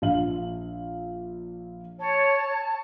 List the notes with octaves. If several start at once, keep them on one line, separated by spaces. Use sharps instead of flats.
A#1 F5 F#7
C#5 A5